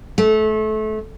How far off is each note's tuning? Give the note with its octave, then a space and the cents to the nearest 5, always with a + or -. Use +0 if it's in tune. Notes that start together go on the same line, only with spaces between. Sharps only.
A3 -25